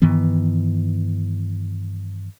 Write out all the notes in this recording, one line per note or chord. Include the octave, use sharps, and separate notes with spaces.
G2 D#3 E3 B3